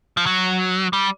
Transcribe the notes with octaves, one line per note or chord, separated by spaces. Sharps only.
F3
F#3
G3